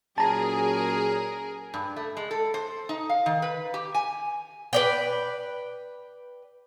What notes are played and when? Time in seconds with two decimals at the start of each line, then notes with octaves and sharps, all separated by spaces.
0.18 A#2 F#3 C#4 G#4 A#4 A5 A#5
1.74 G2
1.96 A3
2.17 G#3
2.31 A4
2.54 C5
2.89 D#4
3.09 F5
3.26 D#3
3.42 B4
3.74 G4
3.94 G#5
4.73 B4 D5 G5